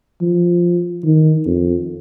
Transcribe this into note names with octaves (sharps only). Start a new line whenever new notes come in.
F3
D#3
F2